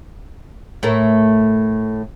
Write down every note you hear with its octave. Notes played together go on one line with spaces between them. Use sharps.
A2 A3 A#4